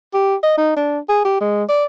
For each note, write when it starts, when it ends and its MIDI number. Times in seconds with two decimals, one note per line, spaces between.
0.14 0.35 67
0.43 0.56 75
0.58 0.75 63
0.76 0.99 62
1.09 1.23 68
1.25 1.36 67
1.41 1.64 56
1.69 1.85 74